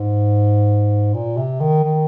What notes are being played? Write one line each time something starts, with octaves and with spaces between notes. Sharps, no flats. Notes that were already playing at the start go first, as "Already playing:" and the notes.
Already playing: G#2
A#2
C3
D#3
D#3